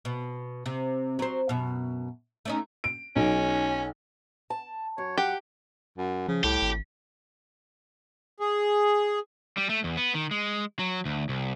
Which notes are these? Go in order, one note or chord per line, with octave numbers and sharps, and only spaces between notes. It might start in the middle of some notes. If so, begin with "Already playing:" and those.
B2
C3
F#3 C5
F#2 B2
A3 C#4 D#4
D7
B1 C#4 D#4
A5
F#2 C#5
G4 F#5
F#2
C#3 F3
C2 A2 G4
G#1
G#4
G3
A3
E2
B3
D#3
G#3
F#3
D2
C2